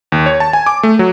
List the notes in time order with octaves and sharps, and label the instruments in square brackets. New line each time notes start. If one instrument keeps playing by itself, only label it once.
[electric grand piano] D#2
C#5
A5
G#5
D6
A3
F#3